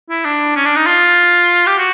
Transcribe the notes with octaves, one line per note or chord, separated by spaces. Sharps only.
E4
D4
C#4
D4
D#4
F4
G4
F#4